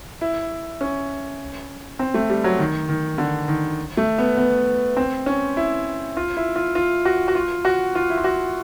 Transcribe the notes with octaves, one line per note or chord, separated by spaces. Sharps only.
E4
C#4
C4
A3
G3
F#3
D#3
D#3
D3
D#3
A3
B3
B3
C4
C#4
E4
F4
E4
F4
F4
F#4
F#4
F4
F#4
F4
E4
F4
F#4